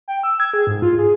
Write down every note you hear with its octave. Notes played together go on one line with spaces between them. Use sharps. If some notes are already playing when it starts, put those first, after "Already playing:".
G5
E6
G#6
G#4
G#2
F4
G#4